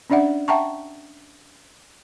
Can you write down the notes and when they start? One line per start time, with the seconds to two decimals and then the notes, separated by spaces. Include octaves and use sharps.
0.10 C#4 D4 D5 E5 F#5
0.48 E5 F#5 G5 A5 A#5 C#6